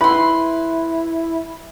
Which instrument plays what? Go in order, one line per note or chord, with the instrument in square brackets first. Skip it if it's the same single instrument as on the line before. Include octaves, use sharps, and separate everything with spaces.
[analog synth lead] E4 [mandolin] B4 C6 [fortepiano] B5